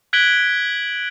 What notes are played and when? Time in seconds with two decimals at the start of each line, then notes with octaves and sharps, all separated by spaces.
0.13 F#6 G#6 B6 D7 F#7 G7